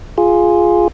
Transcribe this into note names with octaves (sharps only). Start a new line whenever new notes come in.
F4 G#4